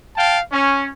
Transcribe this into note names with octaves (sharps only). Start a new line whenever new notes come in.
F5 G5 A5
C#4